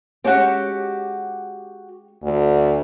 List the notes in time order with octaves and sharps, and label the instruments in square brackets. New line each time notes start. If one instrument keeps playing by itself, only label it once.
[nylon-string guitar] G#3 C#4 [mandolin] F#4 G4
[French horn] D2